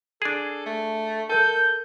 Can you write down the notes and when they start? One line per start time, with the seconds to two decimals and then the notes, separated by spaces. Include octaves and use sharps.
0.22 D4 G#4 A4
0.66 A3
1.29 A4 A#4 A5 G6